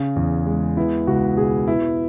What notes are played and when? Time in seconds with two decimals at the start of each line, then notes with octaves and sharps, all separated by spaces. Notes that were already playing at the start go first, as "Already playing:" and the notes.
Already playing: C#3
0.16 E2
0.46 G#3
0.77 B3 E4
1.07 C#2 F#4
1.37 B2 G#4
1.68 B3 E4